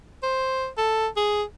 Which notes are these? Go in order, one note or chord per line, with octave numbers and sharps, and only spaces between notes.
C5
A4
G#4